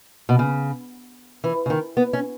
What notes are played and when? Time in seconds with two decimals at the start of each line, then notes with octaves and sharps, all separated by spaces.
0.29 B2
0.39 C#3
1.44 E3
1.66 C#3
1.70 D#3
1.97 B3
2.13 C#4